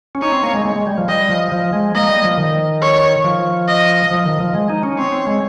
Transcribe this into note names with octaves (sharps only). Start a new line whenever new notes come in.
C#4
D#4 C#5
C4
A#3
G#3
G#3
G#3
G3
F3
G3 D#5
F3
F3
G#3
A#3 D#5
G3
F3
D#3
C#5
F3
D#5
F3
D#3
F3
G#3
D#4
C#4
C4 C#5
C4
G#3